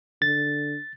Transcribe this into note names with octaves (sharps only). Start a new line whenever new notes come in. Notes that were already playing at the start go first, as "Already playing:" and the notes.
D3 A6